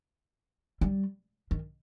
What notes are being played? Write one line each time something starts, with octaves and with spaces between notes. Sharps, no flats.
G3
D#3